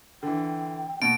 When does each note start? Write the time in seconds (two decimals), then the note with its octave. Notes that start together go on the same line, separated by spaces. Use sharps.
0.23 D3 E3 G5
1.02 B2 A#3 D7